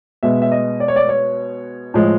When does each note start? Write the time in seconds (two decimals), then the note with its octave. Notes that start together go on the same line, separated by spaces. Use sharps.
0.23 B2 G#3 B3 E5
0.42 E5
0.52 D#5
0.80 D5
0.88 C#5
0.96 D5
1.09 C#5
1.94 A2 F3 G#3